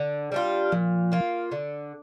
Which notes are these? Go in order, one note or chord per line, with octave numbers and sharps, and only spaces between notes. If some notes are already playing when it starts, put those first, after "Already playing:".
Already playing: D3
G3 D4 F4
A#2 F3
A#3 F4
D3